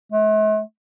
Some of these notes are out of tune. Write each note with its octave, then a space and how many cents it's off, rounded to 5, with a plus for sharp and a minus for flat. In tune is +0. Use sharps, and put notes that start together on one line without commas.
A3 -45